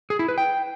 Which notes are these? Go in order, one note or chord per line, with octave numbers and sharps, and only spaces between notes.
G#4
E4
B4
G5